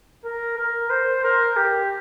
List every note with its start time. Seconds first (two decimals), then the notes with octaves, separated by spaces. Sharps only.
0.25 A#4
0.58 A#4
0.90 C5
1.24 A#4
1.56 G4